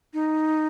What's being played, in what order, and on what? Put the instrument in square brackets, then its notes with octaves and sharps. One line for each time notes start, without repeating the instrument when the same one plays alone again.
[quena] D#4